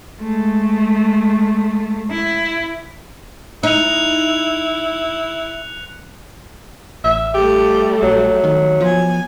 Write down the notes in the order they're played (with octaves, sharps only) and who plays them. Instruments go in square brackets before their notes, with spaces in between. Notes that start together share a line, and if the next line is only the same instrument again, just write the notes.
[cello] G#3 A3
E4
[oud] D#4 [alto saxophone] E4 [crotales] F#6 C#7 F7
[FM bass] A1 [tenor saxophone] E5
[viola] G3 A3 [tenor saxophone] G4
[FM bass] A#1 [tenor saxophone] F#3
[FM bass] D#3
[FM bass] F3 [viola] B3 G#5